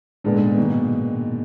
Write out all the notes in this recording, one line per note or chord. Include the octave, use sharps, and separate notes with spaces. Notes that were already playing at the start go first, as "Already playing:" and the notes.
A#2 D3 G#3 B3 D4
G#2
A#2
B2 D#3